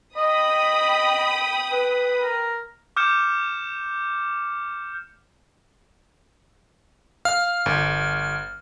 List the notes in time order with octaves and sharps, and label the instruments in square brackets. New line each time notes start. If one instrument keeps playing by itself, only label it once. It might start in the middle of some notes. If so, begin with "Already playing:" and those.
[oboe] D#5 [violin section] G5 B5 D#6
[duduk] B4
[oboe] A#4
[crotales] D6 F6 G6 C#7 E7
[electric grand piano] F5 [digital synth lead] F6
[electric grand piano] G1